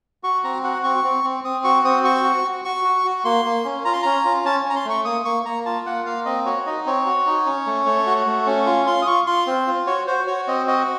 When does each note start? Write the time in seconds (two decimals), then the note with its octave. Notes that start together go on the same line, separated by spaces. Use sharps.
0.23 F#4 C#6
0.44 C4 A#5
0.64 F#4 F#5
0.84 C4 C#6
1.04 C4
1.24 C4
1.44 C4 D#6
1.64 F#4 C#6
1.84 C4 D#6
2.04 F#4 C#6
2.24 F#4
2.44 F#4
2.64 F#4 C#6
2.85 F#4
3.05 F#4
3.25 A#3 C6
3.45 A#3
3.65 C#4
3.85 F4 A#5
3.93 C6
4.02 C#4 A#5
4.25 F4
4.45 C#4 A5
4.65 C#4 A#5
4.76 C6
4.85 A3 C#6
5.05 A#3 D#6
5.25 A#3 C#6
5.45 A#3 A#5
5.66 F4 A5
5.86 A#3 F#5
6.06 A#3 F5
6.25 C4 D#5
6.45 F#4 C#5
6.66 D#4 D#5
6.86 C4 C#5
7.06 F#4
7.26 D#4
7.46 C#4
7.66 A3
7.86 A3
8.06 F#4
8.27 A3
8.47 C#4
8.66 F4
8.86 F4 C6
9.02 D#6
9.07 F4 C#6
9.27 F4 C6
9.47 C4
9.67 F4
9.87 F#4 C#5
10.07 F#4 C5
10.27 F#4 C#5
10.48 C4 D#5
10.67 F#4 D#5